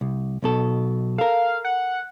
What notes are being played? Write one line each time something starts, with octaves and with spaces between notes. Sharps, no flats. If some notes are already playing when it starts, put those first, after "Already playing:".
C2
B1 B2 A4
A4 A#4 F5
F#5